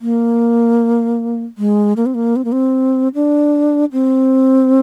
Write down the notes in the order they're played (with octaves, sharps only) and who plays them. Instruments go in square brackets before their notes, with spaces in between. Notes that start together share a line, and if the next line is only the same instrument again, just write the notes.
[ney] A#3
G#3
A#3
C4
A#3
C4
A#3
C4
D4
C4